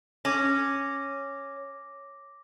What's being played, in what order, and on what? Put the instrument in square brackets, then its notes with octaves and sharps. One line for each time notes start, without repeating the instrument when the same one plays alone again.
[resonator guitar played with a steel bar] C#4 [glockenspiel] D6 A#6